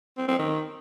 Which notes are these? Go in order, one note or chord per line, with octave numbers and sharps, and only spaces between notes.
C4
C4
D#3